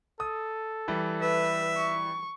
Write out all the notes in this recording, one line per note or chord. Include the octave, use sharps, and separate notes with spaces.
A4 D#6
E3 G3
B4 E5
C#6